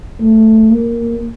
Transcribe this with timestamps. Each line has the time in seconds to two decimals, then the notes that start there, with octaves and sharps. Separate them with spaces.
0.21 A3
0.71 A#3